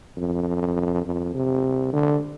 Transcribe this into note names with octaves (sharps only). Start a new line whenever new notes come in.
F2
F2
C3
D3